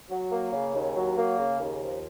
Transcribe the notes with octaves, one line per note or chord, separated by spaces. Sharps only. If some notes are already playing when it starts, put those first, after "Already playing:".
F#3
A#3
C#3
D#2
F#3
A#3
C#3
D#2
F3